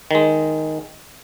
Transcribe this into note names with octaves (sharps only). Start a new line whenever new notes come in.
D#3 G#3